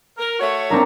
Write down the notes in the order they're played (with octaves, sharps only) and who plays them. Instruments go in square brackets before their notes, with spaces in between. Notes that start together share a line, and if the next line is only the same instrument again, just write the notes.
[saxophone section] A#4
A3 F#4 C#5
[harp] C4 D4 A#4